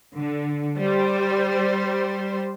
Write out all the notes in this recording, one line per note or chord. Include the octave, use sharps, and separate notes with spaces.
D3
G3 C5